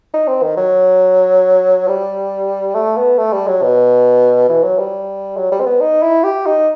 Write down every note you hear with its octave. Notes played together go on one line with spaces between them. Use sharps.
D#4
C4
D#3
F#3
G3
A3
B3
A3
G3
F#3
B2
E3
F#3
G3
F#3
G3
C4
B3
D#4
E4
G4
D#4